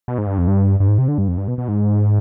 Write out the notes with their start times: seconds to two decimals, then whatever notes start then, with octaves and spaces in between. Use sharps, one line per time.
0.08 B2
0.18 G#2
0.27 G2
0.38 F2
0.48 G2
0.80 G2
0.88 G#2
0.98 C3
1.08 D3
1.18 G2
1.28 F2
1.38 G2
1.48 B2
1.58 B2
1.68 G#2